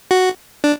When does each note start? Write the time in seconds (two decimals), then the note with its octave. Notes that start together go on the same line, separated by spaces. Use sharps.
0.11 F#4
0.64 D4